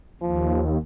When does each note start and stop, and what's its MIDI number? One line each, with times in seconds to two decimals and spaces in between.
0.21 0.77 39
0.21 0.64 53